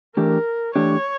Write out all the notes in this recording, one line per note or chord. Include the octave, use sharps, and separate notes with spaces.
E3 A3 D4 G4 A#4
E3 A3 D4 G4 C#5